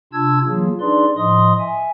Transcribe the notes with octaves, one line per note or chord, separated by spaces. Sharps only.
C3 D4 F4 A5 E6 G#6
E3 F#3 A#3 F4 G#4
D4 D#4 G#4 B4 D5 C6
A2 F3 D#5 C6 D#6
E5 G#5